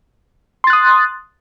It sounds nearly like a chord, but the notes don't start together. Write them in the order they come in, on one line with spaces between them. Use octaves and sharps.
C6 A6 F#6 D#6